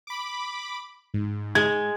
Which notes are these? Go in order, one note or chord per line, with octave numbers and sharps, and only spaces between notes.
B5 D6
G#2
G#3 G#6